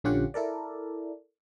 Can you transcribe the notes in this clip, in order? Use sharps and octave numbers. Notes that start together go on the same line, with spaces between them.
A#1 D3 C#4 F4 G4 F#5
E4 A4 A#4 D5